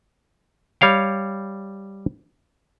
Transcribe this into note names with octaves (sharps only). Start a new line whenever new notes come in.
G3 C#5 F5 G5